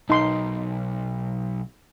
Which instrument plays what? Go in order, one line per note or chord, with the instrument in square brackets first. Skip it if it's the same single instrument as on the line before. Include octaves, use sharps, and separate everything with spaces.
[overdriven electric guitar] B1 [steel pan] D#4 C6